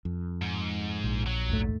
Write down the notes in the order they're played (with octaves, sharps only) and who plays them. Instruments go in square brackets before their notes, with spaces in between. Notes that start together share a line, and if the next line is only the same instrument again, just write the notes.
[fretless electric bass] F2
[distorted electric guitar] G#2
[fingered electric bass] A#1
[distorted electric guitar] F#3
[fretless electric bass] D#2 G#2 A3